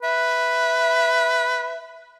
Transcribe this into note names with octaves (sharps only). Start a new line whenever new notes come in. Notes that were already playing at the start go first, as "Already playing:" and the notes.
B4 E5